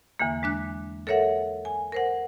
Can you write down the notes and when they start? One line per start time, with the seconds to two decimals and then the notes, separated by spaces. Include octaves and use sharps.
0.20 E2 D3 E3 A#3
0.43 G#3 D4 F#6
1.07 A4 A#4 C#5 E5 F#5
1.65 G#5
1.92 A#4 C5 F#5